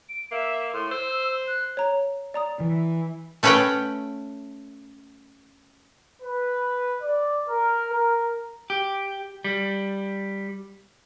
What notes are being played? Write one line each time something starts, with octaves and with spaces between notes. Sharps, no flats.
D7
A#3 E5
A2 C6
C5 E6
F#6
C#5 A#5
D5 A#5 D#6
E3
A3 C#4 B4 C#5 F#5 G5
B4
D5
A#4
A#4
G4
G3